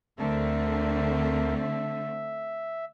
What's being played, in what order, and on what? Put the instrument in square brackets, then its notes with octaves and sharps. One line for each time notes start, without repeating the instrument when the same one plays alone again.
[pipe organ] D2 A#4 E5 [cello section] D3 A3 C4
[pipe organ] E5